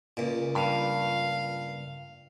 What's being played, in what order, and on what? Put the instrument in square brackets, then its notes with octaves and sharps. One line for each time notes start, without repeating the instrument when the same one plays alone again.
[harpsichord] C#2 A#2
[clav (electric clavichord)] G2 [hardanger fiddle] F5